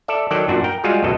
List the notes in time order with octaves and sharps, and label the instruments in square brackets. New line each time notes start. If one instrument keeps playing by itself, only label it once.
[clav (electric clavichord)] A4 D5 E5
D#3 F#3 A4 D5 G5
F#2 A#2 D4 F#4
A#4 G5
G3 G#3 F4 F#4 G#4
C#2 F#2 B2 A4 D#5